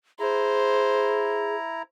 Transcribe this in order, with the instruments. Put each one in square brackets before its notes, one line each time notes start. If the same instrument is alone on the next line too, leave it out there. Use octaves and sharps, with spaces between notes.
[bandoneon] E4 A#5 [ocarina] G#4 [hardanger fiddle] C5